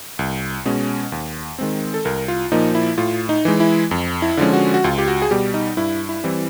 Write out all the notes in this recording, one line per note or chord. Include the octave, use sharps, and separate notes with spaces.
C2
B2 G#3 C#4
D#2
D#3 G#3 C4
A4
C2 A#4
F4
A#2 F3 A#3 D#4
E4
A2 F4
D#4
E3 G#3
E4
F2
E4
D3 F3 G#3 C#4
F#4
F#4
C#2 F4
G4
F#4
G#4
B2 G3 G4
D#4
G2 E4
E4
E3 G3 C4